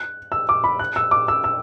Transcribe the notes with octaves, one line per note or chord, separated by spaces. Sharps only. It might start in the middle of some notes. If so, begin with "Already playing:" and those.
Already playing: F#6
E6
D6
B5
F#6
E6
D6
E6
E6